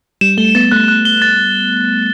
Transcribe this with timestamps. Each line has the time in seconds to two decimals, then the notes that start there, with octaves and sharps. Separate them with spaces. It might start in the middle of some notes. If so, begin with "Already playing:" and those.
0.21 G3 E7
0.38 A3 G7
0.55 B3 A6
0.71 A3 F#6
0.88 F#6
1.05 G7
1.22 A6